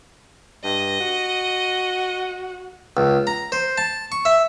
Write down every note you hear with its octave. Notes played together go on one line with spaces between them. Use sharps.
G2 D#5
F#4
C#2
A#5
C5
A5
C#6
E5